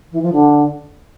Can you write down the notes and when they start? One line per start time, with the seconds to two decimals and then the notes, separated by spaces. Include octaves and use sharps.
0.12 E3
0.22 F3
0.32 D3